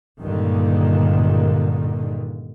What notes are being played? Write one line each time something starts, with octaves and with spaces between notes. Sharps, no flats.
C#2 G2 A#2 D3 D#3 A#3